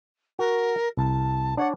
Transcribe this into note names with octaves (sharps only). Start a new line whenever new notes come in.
F#4 A#4
C2 A5
D4 C#5 D5 F#5